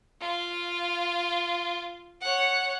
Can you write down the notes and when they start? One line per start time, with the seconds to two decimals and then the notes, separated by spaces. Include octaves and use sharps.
0.21 F4
2.21 C#5 F#5